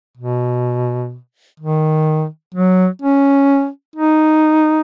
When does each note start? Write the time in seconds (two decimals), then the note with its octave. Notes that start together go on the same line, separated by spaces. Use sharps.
0.18 B2
1.60 D#3
2.54 F#3
3.02 C#4
3.96 D#4